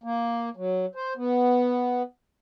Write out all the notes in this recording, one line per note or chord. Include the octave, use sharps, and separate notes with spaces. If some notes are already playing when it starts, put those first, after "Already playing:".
A#3
F#3
C5
B3